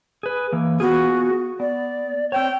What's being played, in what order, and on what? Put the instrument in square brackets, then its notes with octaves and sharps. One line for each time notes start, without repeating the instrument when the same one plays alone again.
[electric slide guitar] G#4 B4
E3 A#3
[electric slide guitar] B3 F4 G#4 [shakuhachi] F#4
[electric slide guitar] B3 [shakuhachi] D5
[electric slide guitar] C4 C5 C#5 [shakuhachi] G5